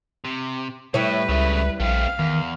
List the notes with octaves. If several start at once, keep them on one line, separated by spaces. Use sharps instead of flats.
C3
A2 G3 E4 B4 C#5
C#2 C#3 A3
A#1 A3 C4 F5
E2 D#3